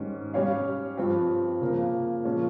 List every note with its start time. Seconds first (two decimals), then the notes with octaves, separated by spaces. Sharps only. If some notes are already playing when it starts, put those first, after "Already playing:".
Already playing: G#2 D#3 G3 C#4
0.34 G3 C#4 G4 C#5 F5
0.97 G2 F3 C4 G4
1.61 C#3 F3 A#3
2.25 A#2 F3 G#3 C#4